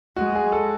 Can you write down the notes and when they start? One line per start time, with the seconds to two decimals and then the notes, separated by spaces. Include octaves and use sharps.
0.16 G#3 F#4
0.35 G#4
0.52 A4